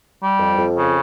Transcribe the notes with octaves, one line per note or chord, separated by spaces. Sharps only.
G3
F2
F2
C#3